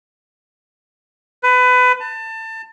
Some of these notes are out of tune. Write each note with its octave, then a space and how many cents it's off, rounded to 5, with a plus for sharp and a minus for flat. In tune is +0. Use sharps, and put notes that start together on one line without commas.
B4 +25
A5 +25